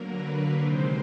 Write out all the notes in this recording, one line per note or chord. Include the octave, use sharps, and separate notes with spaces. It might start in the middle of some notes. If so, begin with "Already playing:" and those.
Already playing: D3 F#3 A#3 A#4
B4
C3 D#3 G#3 C4 C5